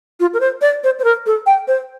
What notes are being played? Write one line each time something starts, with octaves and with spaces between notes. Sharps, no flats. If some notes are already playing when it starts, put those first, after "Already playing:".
F4
A#4
C5
D5
C5
C5
A#4
A4
G5
C5